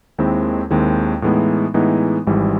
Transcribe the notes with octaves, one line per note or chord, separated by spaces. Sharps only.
D#2 D#3 G#3 C4 E4
D#2 D#3 G#3 C4 E4
A2 E3 G#3 B3 D#4
A2 E3 G#3 B3 D#4
G#1 G#2 E3 G3